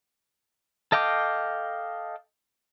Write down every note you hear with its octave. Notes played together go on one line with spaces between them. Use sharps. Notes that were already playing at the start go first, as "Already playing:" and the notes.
A4 D#5 F5 G5 D6